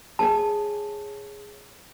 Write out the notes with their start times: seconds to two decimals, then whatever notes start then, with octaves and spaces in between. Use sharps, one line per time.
0.19 G#4 C#5 G#5 A5